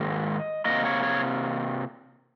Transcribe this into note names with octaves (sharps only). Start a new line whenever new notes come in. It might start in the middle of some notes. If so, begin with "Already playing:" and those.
Already playing: G#2 D#3 A#3 D#5
C3 F3 A#3 D#5
C#5
C#5